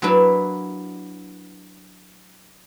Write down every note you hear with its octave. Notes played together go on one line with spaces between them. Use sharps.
F#3 A#3 D4 E4 B4 E5